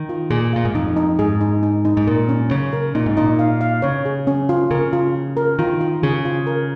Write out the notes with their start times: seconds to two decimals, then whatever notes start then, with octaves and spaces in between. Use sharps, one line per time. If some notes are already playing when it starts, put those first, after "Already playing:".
Already playing: D#3
0.09 F4
0.30 A#2 G#4
0.53 A#2 F5
0.65 G#2
0.75 F2 D#4
0.96 D#4
1.19 G#2 G#4
1.41 D#4
1.63 D#4
1.85 D#4
1.97 G#2
2.07 A#2 A#4
2.29 C#4
2.51 C#3 C#4
2.73 A#4
2.95 A#2 D#4
3.06 G#2
3.17 A#2 D#4
3.39 F5
3.61 F5
3.82 C#3 C#5
4.05 G#4
4.27 C#4
4.49 F4
4.71 C#3 A#4
4.93 F4
5.15 F4
5.37 A#4
5.59 D#3 F4
5.81 F4
6.03 C#3 G#4
6.25 F4
6.47 A#4